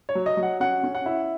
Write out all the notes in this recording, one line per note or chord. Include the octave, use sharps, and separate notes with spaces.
C#5
F#3
D#5
F#3
F#5
C#4 F#5
C#4
F#5
E4